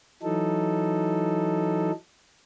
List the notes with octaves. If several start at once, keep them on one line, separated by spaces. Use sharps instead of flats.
E3 F#3 D#4 A4